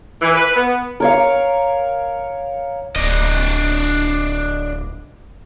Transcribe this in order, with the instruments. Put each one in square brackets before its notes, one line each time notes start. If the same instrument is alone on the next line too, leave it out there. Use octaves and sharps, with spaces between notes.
[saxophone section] E3
B4
B3
[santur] A#4 C#5 F5
[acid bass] D1 [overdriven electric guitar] D4 D#5